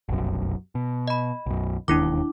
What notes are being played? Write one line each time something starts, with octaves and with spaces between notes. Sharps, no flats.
F1 B1 F#2
B2
D#5 B5
B1 F#2
E1 D#2 D#3 D4 E4 D6